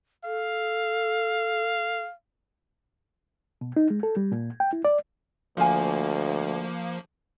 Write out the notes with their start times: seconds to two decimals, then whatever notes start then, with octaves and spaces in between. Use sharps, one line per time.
0.25 A4 F5
3.61 B2
3.77 D#4
3.90 G#3
4.03 A4
4.17 G3
4.32 A#2
4.60 G5
4.73 E4
4.85 D5
5.57 D2 F3 A#3 F4 G#5